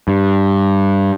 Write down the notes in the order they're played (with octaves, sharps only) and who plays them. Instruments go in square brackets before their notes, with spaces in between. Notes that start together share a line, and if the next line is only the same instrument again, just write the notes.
[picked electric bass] G2